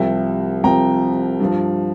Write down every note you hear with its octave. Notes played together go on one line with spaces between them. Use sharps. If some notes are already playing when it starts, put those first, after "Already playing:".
Already playing: C2 C3 F3 E5 G5
C2 C3 F3 G5 A#5
G2 F3